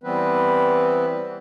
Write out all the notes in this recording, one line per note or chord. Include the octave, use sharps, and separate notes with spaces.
E3 G3 B3 C4 B4